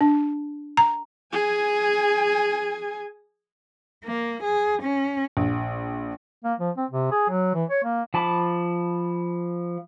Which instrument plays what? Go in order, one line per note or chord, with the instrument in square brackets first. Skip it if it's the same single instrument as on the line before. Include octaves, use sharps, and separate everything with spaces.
[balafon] D4
A#5
[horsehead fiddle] G#4 G#5
[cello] A#3
G#4
C#4
[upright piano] A#1
[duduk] A#3
F3
C4
C3
G#4
F#3
E3
C#5
A#3
[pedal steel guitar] F3 A5 B5 D6